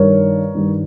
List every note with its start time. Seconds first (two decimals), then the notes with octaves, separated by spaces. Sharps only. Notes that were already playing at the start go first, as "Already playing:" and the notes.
Already playing: G2 D#3 G3 A#4 C#5
0.54 G2 D#3 G3